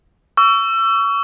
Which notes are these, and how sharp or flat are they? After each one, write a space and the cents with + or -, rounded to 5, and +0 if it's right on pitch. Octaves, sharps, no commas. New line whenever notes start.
C#6 +30 E6 +30